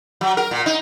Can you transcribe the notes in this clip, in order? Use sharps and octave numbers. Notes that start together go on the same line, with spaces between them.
F#3
A#4
A#2
D#4